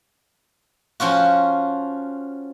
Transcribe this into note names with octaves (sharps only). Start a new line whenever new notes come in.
F3 C#4 F4 F#4